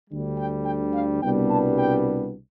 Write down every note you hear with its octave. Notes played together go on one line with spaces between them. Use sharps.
D2 D3 G3
G5
G5
F5
C2 B2 G3 B3 D4 G5
A5
G5